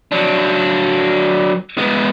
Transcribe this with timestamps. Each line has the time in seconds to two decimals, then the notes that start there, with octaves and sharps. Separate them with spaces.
0.12 F#3 D4
1.78 G#3 B3